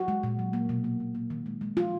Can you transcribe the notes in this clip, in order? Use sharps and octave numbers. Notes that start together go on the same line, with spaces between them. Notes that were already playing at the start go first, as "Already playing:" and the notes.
Already playing: F#4
G#3
A#2
F#3
A#3
B2
A#3
B2
A#3
D#3
G#3
G#3
F3 F4